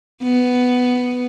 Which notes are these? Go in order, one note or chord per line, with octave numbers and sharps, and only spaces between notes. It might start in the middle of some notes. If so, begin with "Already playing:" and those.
B3